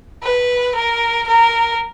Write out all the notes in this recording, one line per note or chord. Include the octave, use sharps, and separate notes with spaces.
B4
A#4
A#4